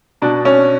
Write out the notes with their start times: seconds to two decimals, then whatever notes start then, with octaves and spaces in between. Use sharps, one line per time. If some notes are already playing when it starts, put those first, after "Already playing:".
0.22 B2 D4
0.45 C#4